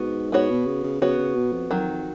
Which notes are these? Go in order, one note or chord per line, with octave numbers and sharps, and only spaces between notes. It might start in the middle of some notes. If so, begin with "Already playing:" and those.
Already playing: G#2 B3 F#4
G#2 B3 F#4 C#5
B2
C#3
C#3
C#3 B3 F#4 C#5
C#3
B2
F2
F2 D#3 F#3